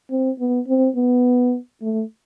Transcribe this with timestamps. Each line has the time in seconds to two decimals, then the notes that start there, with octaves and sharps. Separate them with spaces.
0.11 C4
0.39 B3
0.68 C4
0.96 B3
1.82 A3